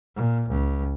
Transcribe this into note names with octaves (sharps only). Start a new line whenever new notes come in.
A#2
C#2